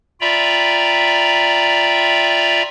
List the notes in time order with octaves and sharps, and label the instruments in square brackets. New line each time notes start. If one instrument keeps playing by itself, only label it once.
[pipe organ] F4 D5 E5 G5 A#5 B5